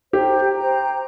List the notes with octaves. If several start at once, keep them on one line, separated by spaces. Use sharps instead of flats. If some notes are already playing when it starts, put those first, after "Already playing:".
G4 C5 G5 A#5
C5 G5 A#5